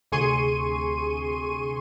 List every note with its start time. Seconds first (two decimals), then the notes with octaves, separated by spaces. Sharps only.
0.12 D2 C3 G#4 C6 C#6 D#7